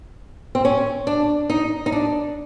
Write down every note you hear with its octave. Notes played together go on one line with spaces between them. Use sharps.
C4
C#4
D4
D#4
D#4
D4